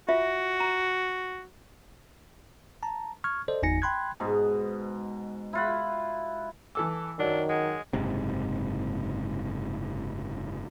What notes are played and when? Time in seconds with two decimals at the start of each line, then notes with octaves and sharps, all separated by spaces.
0.09 F4 F#4 E5
0.60 A#5
2.83 A5 A#5
3.24 C#6 F6 G#6
3.48 A4 C5 D5 D#5
3.62 G1 E2 D#4 G#5 A#6 C#7
3.82 G5 B5 C6 F#6 G#6
4.20 G#2 B2
5.53 E4 F4 F#5
6.75 E3 A4 G#5 D6 E6
7.19 F#2 D#3 F#3 D4
7.49 G#3 F#5
7.93 F#1 G#2 C3